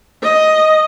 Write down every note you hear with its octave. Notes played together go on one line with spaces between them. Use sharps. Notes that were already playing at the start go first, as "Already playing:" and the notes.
D#5